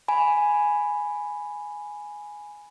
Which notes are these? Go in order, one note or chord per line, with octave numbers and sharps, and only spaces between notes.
G#5 B5